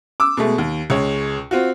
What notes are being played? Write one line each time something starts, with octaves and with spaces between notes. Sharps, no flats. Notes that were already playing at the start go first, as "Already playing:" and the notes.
D6 E6
B2 G#3 A3
D#2
C#2 G#3 C#5
C4 F4 F#4